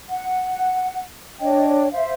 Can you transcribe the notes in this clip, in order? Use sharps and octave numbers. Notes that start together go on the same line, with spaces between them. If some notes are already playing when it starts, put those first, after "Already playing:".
F#5
D4 C#5 D#5 G5
C5 E5 F5